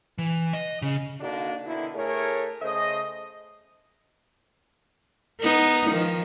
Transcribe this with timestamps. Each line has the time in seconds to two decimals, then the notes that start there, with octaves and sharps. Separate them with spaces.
0.18 E3
0.53 D#5
0.82 C#3
1.20 D3 A#3 D4 D#4 F#4
1.65 B2 D3 D#3 E4
1.94 A2 A3 G#4 A#4 C#5
2.61 C#3 A3 C5 D#5
5.40 B3 D#4
5.90 D#3 F3